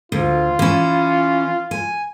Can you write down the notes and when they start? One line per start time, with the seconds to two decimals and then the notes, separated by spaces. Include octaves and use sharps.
0.12 D2 F4
0.59 E3 C#4
1.71 G#5